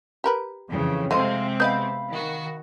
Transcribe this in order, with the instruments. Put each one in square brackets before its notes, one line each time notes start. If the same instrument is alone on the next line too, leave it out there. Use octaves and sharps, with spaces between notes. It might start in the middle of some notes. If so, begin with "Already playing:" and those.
[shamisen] G4 A#4 B4
[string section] F2 C#3 E3
[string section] C3 G#3 C4 [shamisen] A3 C5 [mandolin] D#5 F5 C6
[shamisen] B3 D#5 [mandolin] F5 B5 G6
[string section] D#3 F#4